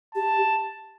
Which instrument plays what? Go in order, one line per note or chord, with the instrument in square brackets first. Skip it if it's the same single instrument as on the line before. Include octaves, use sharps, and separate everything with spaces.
[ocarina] G4 [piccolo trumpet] A5